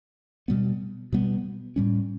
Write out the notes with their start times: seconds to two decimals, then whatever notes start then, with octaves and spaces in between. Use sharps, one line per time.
0.48 B2 G3 B3
1.13 B2 G3 B3
1.76 A2 G3 C#4